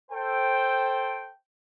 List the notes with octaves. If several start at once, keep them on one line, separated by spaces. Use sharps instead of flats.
A4 C5 G5